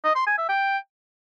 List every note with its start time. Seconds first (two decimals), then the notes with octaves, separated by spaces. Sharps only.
0.04 D#5
0.16 C6
0.27 G#5
0.38 E5
0.49 G5